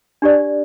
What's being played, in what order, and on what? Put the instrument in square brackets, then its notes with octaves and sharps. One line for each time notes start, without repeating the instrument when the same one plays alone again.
[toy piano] D4 G4 D5